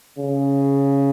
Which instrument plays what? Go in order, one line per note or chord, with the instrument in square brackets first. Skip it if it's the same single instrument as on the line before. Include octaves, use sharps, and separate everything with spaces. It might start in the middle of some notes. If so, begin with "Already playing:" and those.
[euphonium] C#3